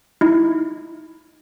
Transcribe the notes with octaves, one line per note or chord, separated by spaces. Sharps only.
D#4 E4